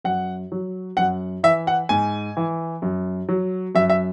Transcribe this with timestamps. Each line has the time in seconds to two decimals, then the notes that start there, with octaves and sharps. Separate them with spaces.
0.04 F#2 F#5
0.52 F#3
0.97 F#2 F#5
1.43 E3 E5
1.67 F#5
1.89 G#2 G#5
2.37 E3
2.82 F#2
3.29 F#3
3.75 F#2 E5
3.90 E5